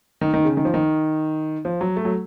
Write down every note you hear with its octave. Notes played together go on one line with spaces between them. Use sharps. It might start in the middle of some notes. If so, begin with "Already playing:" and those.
D#3
D#3
C#3
D#3
F3
D#3
F3
F#3
A3
F#3